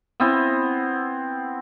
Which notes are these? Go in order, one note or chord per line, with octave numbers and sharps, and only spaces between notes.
B3 C4 E4